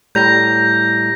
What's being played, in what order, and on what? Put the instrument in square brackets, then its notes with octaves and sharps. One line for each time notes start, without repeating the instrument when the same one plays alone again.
[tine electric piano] A2 G3 A#5 [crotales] G6 A#6